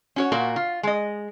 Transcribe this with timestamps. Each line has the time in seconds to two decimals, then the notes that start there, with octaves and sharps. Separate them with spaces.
0.16 C#4 F#4 C#5
0.32 A#2 F#4 A#4
0.56 F4
0.83 G#3 D#5